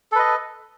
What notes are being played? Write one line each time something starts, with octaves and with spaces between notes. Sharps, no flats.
A4 B4 D#5